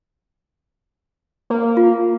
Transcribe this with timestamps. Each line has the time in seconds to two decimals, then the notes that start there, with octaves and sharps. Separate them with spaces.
1.50 A#3
1.77 F4